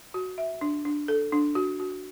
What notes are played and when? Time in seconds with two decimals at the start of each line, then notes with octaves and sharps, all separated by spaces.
0.14 F#4
0.38 E5
0.61 D4
0.85 D4
1.08 A4
1.32 D4
1.55 F#4
1.80 F#4